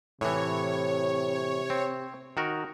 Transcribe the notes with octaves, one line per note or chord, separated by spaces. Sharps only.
A2 C3 E3 C#5
C4
D#3 F#4 A#4